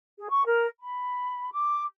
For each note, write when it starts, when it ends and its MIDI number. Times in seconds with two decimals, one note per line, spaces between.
0.18 0.27 68
0.29 0.43 85
0.45 0.66 70
0.80 1.49 83
1.52 1.84 86